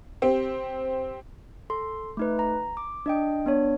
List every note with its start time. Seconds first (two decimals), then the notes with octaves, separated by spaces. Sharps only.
0.22 C4 G4
1.70 A4 C6
2.17 A3 D#4 B4
2.39 A#5
2.77 D6
3.06 D4 D#5 G5
3.46 B3 D4 C#5